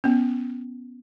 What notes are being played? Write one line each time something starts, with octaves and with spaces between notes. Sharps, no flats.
B3 C#4